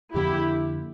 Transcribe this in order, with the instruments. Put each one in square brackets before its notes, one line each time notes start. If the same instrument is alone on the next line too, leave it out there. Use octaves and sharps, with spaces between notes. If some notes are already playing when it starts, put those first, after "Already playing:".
[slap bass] F2 D3 F3 A#3 [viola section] E4 G4